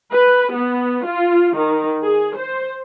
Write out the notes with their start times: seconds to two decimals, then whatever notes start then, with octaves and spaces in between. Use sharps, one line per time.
0.12 B4
0.55 B3
1.06 F4
1.58 D#3
2.05 G#4
2.38 C5